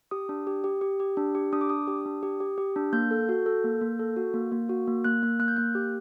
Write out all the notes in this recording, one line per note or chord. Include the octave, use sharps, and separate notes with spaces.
G4 D#6
D4
G4
G4
G4
G4
D4
G4
D4 D#6
D6
D4 D#6
G4
D4
G4
G4
G4
D4
A#3 G6
A4
F#4
A4
A#3
A#3
A4
F#4
A#3
A#3
F#4
A#3
A#3 F#6
A#3
A#3 F#6
G6
A#3 F#6
G4